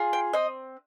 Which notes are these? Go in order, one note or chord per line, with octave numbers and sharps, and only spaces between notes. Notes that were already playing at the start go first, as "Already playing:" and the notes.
Already playing: F4 G#4
G5
C4 D#5